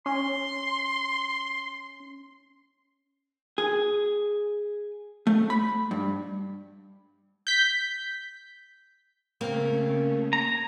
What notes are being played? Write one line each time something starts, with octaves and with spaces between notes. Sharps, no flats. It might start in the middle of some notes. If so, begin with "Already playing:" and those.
C#4 C6
G#4
A3
B5
G2
G6 B6
C#3 A3 A#3 C4 C#4 A#4
A#5 G#6